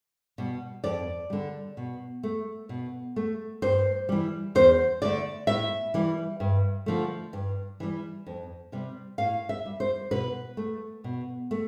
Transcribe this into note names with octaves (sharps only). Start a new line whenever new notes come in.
B2 G3
F2 D5
D3 G3
B2
A3
B2
A3
G2 C5
E3 G3
E2 C5
D3 A3 D5
A2 E5
E3 G3
G2
D3 F3 A3
G2
E3 G3
F2
C3 G3
A2 F5
E5
G3
C5
B2 B4
A3
B2
A3